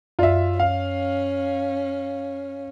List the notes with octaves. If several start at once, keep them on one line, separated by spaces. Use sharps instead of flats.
F#2 F4 D5 E5
C#4 F5